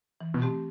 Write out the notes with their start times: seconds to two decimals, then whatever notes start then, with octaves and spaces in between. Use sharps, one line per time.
0.21 E3
0.34 B2
0.42 A3 C4 G4